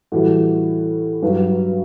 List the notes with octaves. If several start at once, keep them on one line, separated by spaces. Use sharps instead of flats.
A2 E3 G3 F#4
G2 F#3 B4